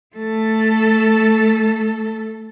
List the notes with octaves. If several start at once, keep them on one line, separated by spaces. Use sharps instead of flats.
A3 A4